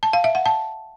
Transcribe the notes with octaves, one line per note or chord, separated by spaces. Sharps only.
A5
F5
E5
F#5
A5